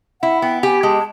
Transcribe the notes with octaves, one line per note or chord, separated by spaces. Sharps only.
E4 F#5
B3 G5
G4 G#5
G#3 A5